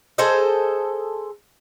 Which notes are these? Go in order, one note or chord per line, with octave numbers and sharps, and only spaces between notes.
G#4 A4 C5 D#5